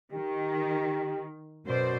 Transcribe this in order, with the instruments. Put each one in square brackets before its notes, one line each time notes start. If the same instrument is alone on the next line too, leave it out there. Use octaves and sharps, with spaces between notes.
[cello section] D#3 [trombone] G4
[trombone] F#2 [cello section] B2 C5 D5